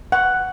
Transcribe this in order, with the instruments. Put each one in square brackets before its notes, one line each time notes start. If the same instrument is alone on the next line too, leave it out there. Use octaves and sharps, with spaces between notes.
[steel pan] F#5